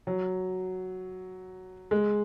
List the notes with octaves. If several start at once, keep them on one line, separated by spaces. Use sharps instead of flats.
F#3
G#3